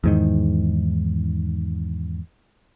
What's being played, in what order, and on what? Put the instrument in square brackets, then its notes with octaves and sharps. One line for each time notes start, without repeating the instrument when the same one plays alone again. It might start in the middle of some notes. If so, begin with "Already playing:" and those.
[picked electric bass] E2 G#2 D#3